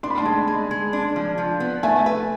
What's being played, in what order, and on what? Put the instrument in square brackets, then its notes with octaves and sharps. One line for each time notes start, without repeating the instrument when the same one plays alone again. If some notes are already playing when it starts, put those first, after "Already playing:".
[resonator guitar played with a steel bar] D4 [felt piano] C6
[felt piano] B5
A5 C6
[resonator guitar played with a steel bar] G#3
G#3
G#3
D4
F3
F3
B3
[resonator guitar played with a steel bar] A3 [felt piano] E5 G#5
[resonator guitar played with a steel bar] B4